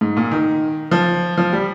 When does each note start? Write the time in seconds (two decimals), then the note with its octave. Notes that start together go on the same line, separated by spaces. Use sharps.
0.01 G#2
0.17 A#2
0.32 D#3
0.91 F3
1.38 F3
1.53 G3